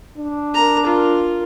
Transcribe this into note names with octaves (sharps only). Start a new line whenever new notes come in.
D4
A#4 A#5
F4 A#4